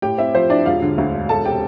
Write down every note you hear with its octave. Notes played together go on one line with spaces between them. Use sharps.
A2 G4 G5
C4 E4 E5
F3 C5
D4 E4 D5
E1 F4 F5
D3
D2
E1
E1 A4 A5
C3 G4 G5